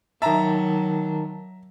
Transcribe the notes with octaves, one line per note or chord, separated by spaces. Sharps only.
D#3 F#3 E5 A5 A#5